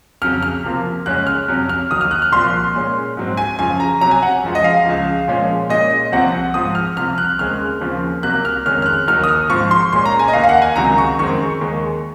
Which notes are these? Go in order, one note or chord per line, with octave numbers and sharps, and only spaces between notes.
F2 C#3 F#3 F6
F6
C3 F3 A#3
F#2 C#3 G#3 C#4 F#6
F6
F2 C3 F#3 C#4
F6
D#2 D#3 F#3 D#6
F6
F#6
F6
C2 A#2 F3 C6
A#2 G#3 C#4
G#2 F#3 C4
G#5
F#2 C#3 F3 G#5
A#5
C3 F#3 C#4 A#5
G#5
F#5
F#2 F3 G#3
D#5
F5
C#2 C#3 F3
A#2 F3 G#3 C#4
A#2 G#3 C#4 D#5
C2 C3 F3 C4 F#5
G#2 F3 C4 D#6
F6
C2 C3 F3 F6
F#6
D#2 C#3 G#3 C4 F6
D#2 C#3 F3 C4
C2 C3 F#3 A#3 F#6
F6
F2 D#3 G#3 C#4 F6
F6
F#6
D#2 D#3 F#3 F6
D#6
F6
G#2 F3 C4 C#6
C6
A#2 G#3 C#4 C6
A#5
G#5
D#5
D#2 D#3 A#3 F5
F5
F#5
G#5
C#2 C3 D#3 F#3 A#5
C#6
F#2 D#3 G#3 C4 C#6
D#2 D#3 G#3